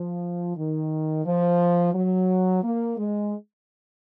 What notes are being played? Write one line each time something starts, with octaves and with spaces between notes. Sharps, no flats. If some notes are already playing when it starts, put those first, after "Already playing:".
Already playing: F3
D#3
F3
F#3
A#3
G#3